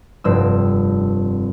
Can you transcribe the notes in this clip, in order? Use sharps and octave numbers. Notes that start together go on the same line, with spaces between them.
F1 G2 C4 E6